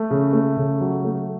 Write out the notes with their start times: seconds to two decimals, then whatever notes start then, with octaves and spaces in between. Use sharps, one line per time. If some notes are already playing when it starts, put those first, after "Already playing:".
Already playing: A3
0.11 C#3
0.33 A3
0.57 C#3
0.81 F#3
1.04 A3